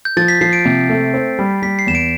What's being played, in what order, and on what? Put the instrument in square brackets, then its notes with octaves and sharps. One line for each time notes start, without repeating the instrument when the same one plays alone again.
[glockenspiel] G6
[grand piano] F3 [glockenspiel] A6
[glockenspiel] B6
[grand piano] F3 [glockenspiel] C7
[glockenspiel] D7
[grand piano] C3
A3
C4
G3
[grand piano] G3 [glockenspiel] B6
[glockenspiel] C7
[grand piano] E2 [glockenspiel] E7
[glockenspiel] D7